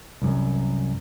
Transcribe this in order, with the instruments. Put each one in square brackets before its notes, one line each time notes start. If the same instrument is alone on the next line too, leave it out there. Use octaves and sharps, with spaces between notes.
[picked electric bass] C2 F#2